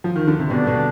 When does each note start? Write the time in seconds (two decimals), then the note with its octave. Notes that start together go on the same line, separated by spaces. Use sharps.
0.04 F3
0.16 D#3
0.27 D3
0.39 C3
0.49 B2 D3 G3 B3 D4
0.67 B2